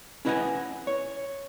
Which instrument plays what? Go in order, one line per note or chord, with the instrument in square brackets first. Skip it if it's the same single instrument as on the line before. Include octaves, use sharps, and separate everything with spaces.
[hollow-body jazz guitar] C#4 E4 B4 D#5 F#5 G#5
C#5